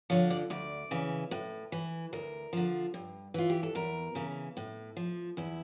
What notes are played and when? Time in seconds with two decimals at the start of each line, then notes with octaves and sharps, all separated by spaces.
0.10 D3 F3 C#5
0.30 D5
0.50 D2 D5
0.91 C#3 E3
1.31 A2
1.72 E3
2.13 D2 A#4
2.53 D3 F3
2.94 G2
3.34 E3 F4
3.50 G4
3.63 A4
3.75 E2 A#4
4.15 C#3 E3
4.57 A2
4.97 F3
5.37 E2 E4